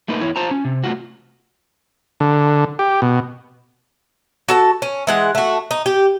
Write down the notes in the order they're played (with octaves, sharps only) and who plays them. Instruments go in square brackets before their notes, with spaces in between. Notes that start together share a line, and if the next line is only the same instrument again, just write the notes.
[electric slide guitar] A3 A#3 D#4 B4
E2 E4 C#5
F4 C5 A5 A#5
C#4
C3
A3 F4 F#4
[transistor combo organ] D3
G4
B2
[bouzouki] F#4 A4 A5
C#4
E3 G#3 F#5
A3 F#4
D#4
G4